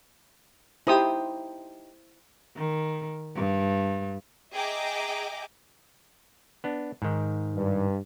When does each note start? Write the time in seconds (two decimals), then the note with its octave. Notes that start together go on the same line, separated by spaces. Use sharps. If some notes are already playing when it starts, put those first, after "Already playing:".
0.87 D#4 E4 G4 C5 D#6
2.56 D#3
3.36 G2
4.53 G#4 D#5 E5 G5 A#5 D6
6.64 B3 D4
7.02 G#2 D#3
7.55 G2